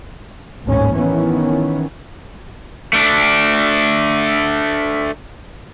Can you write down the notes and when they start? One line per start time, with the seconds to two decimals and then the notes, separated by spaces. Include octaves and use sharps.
0.64 A1 D#2 G#2 C#4
0.95 D#3 E3 B3 C#4
2.93 A3 D4